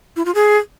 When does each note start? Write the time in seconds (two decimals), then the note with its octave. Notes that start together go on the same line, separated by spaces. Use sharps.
0.16 E4
0.25 F4
0.35 G#4